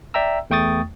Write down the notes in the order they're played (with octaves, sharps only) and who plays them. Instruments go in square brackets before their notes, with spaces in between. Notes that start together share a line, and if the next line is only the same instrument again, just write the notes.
[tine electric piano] D5 E5 G5 A#5 E6
E2 A3 G5 C#6 D#6 A6